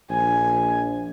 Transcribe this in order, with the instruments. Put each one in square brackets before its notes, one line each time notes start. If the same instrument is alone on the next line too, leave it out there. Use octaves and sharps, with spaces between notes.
[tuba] A#1 [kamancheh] G#5